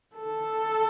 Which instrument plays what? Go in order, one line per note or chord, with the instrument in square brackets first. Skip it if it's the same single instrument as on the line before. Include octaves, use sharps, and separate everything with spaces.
[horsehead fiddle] A4